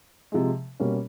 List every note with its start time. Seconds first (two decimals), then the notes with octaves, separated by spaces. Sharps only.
0.32 C3 F3 G#3
0.80 B2 G3 A#3 C#4